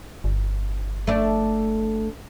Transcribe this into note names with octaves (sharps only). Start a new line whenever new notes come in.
G1
A3 D4